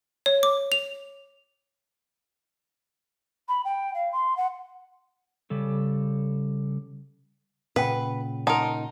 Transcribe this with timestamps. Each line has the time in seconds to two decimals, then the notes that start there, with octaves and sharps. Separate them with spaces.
0.26 C#5
0.43 D6
0.72 F7
3.48 B5
3.64 G5
3.94 F5
4.12 C6
4.36 F#5
5.50 C#3 G3 A4
7.76 A#2 C#3 B4 F#5 G5 B5
8.47 D#4 A#4 F#5 A5 C6